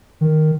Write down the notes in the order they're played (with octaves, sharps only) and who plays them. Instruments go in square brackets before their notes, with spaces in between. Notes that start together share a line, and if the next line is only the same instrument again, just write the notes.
[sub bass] D#3